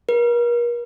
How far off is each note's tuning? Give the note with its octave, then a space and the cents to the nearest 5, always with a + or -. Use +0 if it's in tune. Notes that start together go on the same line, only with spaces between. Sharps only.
A#4 +40